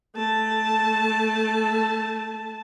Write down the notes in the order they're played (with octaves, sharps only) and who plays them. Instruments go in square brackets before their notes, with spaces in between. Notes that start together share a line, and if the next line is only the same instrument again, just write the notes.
[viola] A3 A5